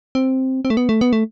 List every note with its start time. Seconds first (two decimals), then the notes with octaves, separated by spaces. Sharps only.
0.15 C4
0.65 C4
0.70 A3
0.77 B3
0.89 A3
1.01 B3
1.13 A3